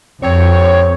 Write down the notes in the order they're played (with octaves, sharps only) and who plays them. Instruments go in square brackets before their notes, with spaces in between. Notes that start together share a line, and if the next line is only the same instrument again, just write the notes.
[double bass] F2 [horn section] C4 C#5